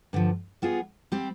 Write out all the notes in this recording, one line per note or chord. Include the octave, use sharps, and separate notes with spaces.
G2 D3 F3
G3 B3 F4 G#4
G3 C4 G4